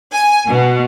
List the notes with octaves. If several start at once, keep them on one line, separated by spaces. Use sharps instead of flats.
G#5
B2